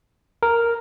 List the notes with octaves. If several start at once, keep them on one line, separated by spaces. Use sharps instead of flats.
A#4